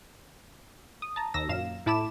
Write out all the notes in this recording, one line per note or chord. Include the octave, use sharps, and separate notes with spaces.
D#6
A5 A#5
D#2 E6 A#6
F#2 A#2 F5 E7
A2 E4 A5 B5 D6 E7